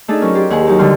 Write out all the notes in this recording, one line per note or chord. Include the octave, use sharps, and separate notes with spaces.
A3 D4 D#4 G#4 A4
F#3 C#4 A#4
G4 C5 D5
D#2 G#4 F#5
F#3 D#4 G4
D3 F3 G3 C6 F6